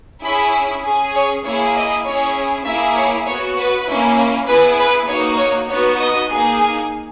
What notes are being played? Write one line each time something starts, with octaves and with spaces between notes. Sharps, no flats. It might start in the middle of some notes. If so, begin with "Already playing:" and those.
C#4 E4 G#4 B5
C#4 G#4
C#5
A#3 E4 G#4 C#5
D#5
C#4 E4 G#4 C#5
A#3 E4 G#4 E5
C#5
B3 F#4 C#5
B4
A#3 C#4 E4
B3 E4 G#4 B4
B4
A#3 D#4 F#4 C#5
C#5
B3 D#4 F#4 C#5
D#5
A#3 D#4 G#4
G#5